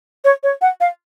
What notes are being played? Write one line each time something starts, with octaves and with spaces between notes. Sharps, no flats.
C#5
C#5
F#5
F5